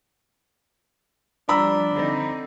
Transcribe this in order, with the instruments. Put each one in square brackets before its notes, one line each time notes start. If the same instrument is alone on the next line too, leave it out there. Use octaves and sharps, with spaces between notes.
[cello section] F3 G3 [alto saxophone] D4 [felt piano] A#5 B5 E6
[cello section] D3 C4 D#4